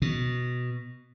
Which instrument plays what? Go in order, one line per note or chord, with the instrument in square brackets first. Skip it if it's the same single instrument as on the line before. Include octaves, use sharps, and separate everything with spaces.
[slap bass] B2